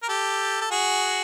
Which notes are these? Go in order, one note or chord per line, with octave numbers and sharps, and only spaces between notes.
A#4
G4 A4
A4
F#4 G#4